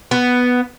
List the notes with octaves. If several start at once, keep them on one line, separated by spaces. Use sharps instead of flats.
B3